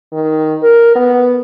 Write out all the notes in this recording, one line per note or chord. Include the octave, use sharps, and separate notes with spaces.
D#3
A#4
B3